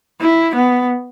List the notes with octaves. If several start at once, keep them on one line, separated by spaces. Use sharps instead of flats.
E4
B3